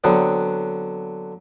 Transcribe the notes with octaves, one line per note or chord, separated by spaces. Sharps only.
D3 F#3 B3 C4